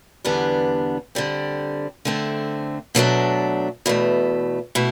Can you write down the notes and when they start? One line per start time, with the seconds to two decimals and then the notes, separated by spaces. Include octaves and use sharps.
0.25 E2 D3 G3 B3 D4
1.15 D3 G3 C4
2.05 D3 A3 C4
2.95 B2 F#3 A3 D4
3.86 E2 B2 A3
4.75 B2 A3 E4